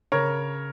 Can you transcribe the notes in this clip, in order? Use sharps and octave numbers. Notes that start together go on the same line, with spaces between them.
C#3 A#4 C#5